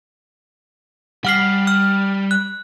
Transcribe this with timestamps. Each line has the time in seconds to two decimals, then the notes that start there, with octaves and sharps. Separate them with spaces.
1.25 G3 F#5 F6 C7
1.67 F6
2.31 F#6